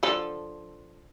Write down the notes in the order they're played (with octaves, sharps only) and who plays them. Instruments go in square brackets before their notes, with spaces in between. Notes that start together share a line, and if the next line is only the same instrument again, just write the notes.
[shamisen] D3 F3 A4